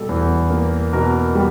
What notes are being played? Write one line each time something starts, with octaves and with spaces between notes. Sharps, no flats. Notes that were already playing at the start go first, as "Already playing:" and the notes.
Already playing: B2 G3 A4
E2
A#3
B2 A#4
G3